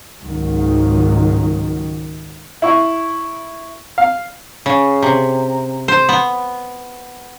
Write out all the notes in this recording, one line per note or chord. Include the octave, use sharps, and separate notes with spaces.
C#2 G#2 D#3 F#3
E4 C#6
F5
C#3
C3
C5
B3